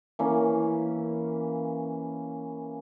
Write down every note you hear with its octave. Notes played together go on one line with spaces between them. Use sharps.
E3 A#3 C#4